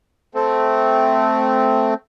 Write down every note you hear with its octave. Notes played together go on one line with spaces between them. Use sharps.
A3 C4